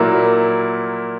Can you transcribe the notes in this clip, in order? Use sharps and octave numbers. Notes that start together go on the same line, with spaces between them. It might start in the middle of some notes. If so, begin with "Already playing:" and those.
Already playing: A#2 F#3 A#3 E4